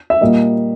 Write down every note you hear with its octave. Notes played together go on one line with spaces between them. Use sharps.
E5
A#2 G3 A#3 D#5